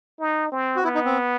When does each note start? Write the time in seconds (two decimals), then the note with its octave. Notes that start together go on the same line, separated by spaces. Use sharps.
0.20 D#4
0.52 C4
0.76 F#4
0.84 B3 E4
0.95 D#4
1.05 C4